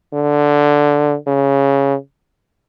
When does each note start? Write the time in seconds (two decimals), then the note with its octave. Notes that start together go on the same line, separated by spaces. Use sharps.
0.14 D3
1.27 C#3